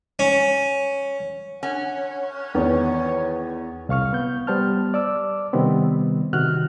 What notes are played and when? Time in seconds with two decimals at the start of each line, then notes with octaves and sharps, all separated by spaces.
0.19 C#4
1.63 C#4 F#5
2.55 E2 D#3 B3 C#5
3.89 C2 F5 C#6 F6
4.13 B3 G6
4.47 G3 B3 C5 A5 F6
4.94 D5 D6 E6
5.53 C3 D#3 G3 B3 C4
6.33 C3 D#3 F#4 F6 F#6